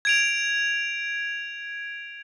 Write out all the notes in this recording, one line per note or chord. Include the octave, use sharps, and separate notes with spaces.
G#6 D7 F7